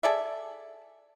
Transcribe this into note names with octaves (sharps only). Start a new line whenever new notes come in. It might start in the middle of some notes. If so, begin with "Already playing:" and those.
G#4 A4 D5 E5